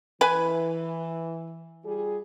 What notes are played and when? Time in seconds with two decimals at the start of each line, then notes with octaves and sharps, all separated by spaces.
0.21 E3 B4 G#5
1.85 G3 F4 G#4